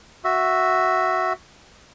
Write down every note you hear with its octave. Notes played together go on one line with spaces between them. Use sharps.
F#4 E5